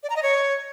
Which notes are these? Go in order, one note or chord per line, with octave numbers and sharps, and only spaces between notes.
D5
A#5
D#5
C#5